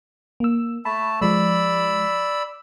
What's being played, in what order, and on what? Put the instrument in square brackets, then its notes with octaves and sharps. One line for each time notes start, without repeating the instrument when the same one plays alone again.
[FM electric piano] A#3 E6
[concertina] A3 A5 [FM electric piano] B5
[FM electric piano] F3 G#3 [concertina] D5 B5 E6